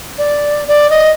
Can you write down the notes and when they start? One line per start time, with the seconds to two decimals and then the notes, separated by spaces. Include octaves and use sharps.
0.18 D5
0.68 D5
0.90 D#5